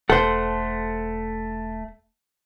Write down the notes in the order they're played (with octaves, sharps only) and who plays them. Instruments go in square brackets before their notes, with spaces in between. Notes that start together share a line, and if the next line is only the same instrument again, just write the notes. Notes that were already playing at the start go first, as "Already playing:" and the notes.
[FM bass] E1 [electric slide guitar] A3 [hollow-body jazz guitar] A4 C5 [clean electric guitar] F#5 C6